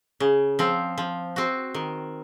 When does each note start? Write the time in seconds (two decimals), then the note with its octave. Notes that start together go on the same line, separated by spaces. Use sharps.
0.20 C#3
0.59 F3 C4
0.98 F3
1.36 C4 F#4
1.74 D#3